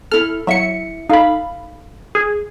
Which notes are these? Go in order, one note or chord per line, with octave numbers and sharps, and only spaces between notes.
E4 A4 F6
F#3 E4 E5 C#7
D#4 A4 F5 B5
G#4